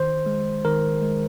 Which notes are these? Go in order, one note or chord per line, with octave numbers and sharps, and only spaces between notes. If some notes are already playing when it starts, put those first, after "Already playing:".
Already playing: D#3 C5
G#3
D#3 A#4
G#3